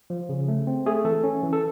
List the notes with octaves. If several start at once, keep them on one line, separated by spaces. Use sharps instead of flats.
F3
C#3
A3
C4
A3 G#4
E3 A4
C#4
E3
A4